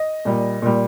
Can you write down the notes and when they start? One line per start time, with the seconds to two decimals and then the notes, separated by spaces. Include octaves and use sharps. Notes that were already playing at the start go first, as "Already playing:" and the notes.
Already playing: D#5
0.25 A#2 G3
0.62 A#2 G3